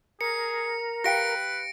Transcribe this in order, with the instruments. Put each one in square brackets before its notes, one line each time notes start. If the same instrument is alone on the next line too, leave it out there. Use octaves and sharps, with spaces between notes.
[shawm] G#4 [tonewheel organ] A#4 [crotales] C#7
[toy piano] G4 F5 G5 [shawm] B4 [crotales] A#6 D7